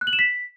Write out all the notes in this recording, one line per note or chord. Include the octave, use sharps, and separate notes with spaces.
F#6
F#7
E7
B6